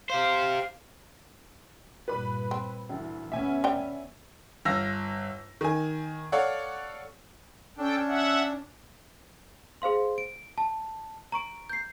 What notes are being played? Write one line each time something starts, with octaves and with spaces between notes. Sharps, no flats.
G4 C5 F5
G2 A#2 B4 B5
C4
D2 E3
D2 B3 C#4 E5 G#5
D4 G5
G1 F5 E6 A#6
D#3 G#5
A4 C#5 D5 F5 F#5
C#4 D4 A4 G5
E5 F#5
G#4 C5 F5 C6
D7
A5
A#5 C#6 D7
G6 C7